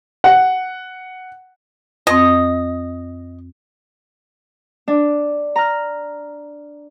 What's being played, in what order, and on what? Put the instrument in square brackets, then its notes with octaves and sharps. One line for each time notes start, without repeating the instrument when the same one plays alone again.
[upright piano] F#5
[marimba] F2 C4 [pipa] D#5
[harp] D4
A#5 F6